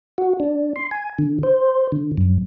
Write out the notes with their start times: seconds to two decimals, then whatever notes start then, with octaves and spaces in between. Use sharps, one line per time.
0.18 F#4
0.40 D4
0.76 C6
0.91 G#5
1.18 D3
1.43 C5
1.92 D3
2.17 F#2